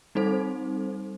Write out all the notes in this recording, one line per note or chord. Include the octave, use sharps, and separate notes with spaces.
G3 C4 D#4 A4 C5